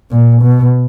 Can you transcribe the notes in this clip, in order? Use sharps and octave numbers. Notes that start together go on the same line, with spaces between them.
A#2
B2